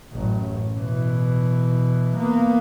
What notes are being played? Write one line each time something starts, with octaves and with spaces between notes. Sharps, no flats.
A1 F#2
B2 E3
A#3 B3